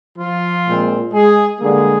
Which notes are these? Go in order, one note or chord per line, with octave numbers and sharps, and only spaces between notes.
F3 F4
A#2 G#3 C4
G#3 G#4
D3 G3 G#3 A#3 G#4